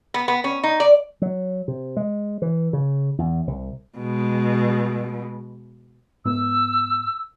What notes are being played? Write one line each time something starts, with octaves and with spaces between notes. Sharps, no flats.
B3
B3
C#4
D#4
D5
F#3
C3
G#3
E3
C#3
E2
C2
B2 G#3
G#2 B3 E6